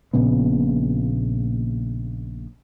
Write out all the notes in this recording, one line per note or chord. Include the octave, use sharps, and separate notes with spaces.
A#1 A#2 C#3 B3